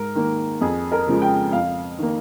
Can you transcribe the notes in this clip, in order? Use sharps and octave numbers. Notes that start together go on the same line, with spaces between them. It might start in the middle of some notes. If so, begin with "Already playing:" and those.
Already playing: G#2 A#4
D#3 A#3
F2 G#4
A#4
C#3 F3 G#3
G5
F2 F5
D#3 A#3